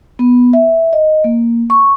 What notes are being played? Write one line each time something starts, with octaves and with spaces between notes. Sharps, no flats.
B3
E5
D#5
A#3
C#6